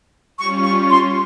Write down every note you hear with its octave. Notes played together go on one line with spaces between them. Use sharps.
G3 C#4 F4 C#6
C#6
C6